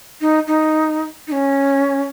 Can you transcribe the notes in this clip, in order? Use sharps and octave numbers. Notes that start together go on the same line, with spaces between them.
D#4
D#4
D#4
C#4